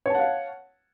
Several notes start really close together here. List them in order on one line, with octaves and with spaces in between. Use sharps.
C#5 A5 F#5 F5